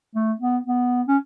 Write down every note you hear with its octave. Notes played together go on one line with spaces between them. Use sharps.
A3
B3
B3
C#4